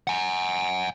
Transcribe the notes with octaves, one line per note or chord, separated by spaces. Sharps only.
F#5 G#5